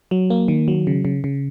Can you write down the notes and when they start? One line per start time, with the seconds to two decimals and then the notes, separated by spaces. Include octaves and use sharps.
0.11 F#3
0.30 A#3
0.48 D#3
0.68 F#3
0.87 C#3
1.05 C#3
1.24 C#3